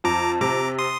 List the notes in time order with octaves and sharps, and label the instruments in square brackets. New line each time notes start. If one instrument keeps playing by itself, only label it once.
[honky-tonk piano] F2 [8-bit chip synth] A#5 D6
[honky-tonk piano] C3 [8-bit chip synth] A#5 D6
[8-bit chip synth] C6 D#6